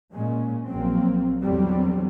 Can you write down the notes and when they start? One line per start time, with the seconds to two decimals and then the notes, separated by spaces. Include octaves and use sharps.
0.13 A#2 G#3 C#4
0.66 A#1 F#3 A#3 C4
1.40 E2 D3 E3 F#3 G3 C4